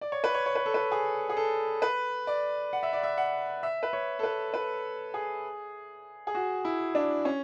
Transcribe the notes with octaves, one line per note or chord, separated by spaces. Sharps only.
D5
C#5
B4
C#5
C#5
B4
A4
B4
G#4
G#4
A4
B4
D5
F#5
E5
D5
E5
F#5
E5
B4
C#5
A4
B4
B4
G#4
G#4
F#4
E4
D4
C#4